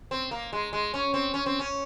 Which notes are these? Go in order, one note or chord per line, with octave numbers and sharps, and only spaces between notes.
C4
A#3
G#3
G#3
C#4
C4
C#4
C4
C#4